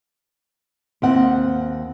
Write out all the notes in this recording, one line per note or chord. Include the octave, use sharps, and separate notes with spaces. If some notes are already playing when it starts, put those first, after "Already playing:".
D#2 C4 F#5